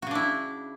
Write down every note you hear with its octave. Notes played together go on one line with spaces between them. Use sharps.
C#3 D4 E4 F#4